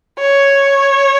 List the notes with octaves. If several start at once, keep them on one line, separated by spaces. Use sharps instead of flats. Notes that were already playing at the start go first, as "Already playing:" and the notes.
C#5